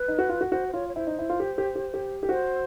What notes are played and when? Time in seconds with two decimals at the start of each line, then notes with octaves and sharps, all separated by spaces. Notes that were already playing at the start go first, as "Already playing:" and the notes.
Already playing: B4
0.08 D#4
0.19 F#4
0.29 F4
0.41 F#4
0.52 F#4 C5
0.68 C5
0.73 F4 C#5
0.89 C#5
0.96 E4 C5
1.07 D#4
1.19 E4
1.30 F4
1.40 G4
1.58 G4
1.76 G4
1.94 G4
2.23 G4
2.29 F#4 C5